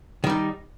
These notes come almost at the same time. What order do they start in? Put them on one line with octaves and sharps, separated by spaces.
D#3 G3 D#4